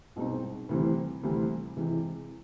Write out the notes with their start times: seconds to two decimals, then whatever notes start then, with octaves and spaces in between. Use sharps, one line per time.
0.16 C2 B2 G#3 C4 D#4
0.69 D2 C3 E3 G3 C4
1.23 D2 C3 E3 G3 C4
1.77 C3 E3 G#3